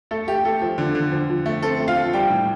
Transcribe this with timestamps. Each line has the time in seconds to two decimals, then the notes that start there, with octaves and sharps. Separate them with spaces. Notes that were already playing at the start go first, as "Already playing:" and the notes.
0.11 A3 A4
0.28 A3 G4
0.45 A3 A4
0.62 F3
0.78 D3
0.95 D3
1.12 F3
1.29 F3
1.46 A3
1.63 C4 A4
1.80 A3
1.88 F4 F5
1.97 A3
2.13 G3 G4 G5
2.30 A2